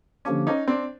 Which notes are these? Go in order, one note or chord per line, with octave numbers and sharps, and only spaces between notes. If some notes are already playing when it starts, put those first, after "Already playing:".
D3 F3 A#3 C#4 D4 G4
C#4 D#4
C4 D4